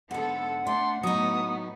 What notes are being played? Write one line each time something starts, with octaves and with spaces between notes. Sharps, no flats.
G#2 D3 B3 A4 F#5
A3 D4 C6
A2 F#3 B3 D#4 D#6